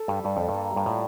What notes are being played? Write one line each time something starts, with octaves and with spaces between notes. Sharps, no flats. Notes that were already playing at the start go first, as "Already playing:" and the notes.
Already playing: A4
G2 G3
G2 G3
F2 A4
G2
A#3
G3
G2
A2 F4